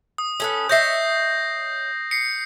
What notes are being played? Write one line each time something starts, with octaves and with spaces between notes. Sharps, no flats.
D#6
C#4 A4 B4
C#5 D#5 E5 G6 A#6 C7
C7 C#7